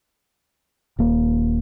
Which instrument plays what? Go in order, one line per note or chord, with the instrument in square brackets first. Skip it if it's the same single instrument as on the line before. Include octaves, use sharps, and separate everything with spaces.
[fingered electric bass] D#1 A#3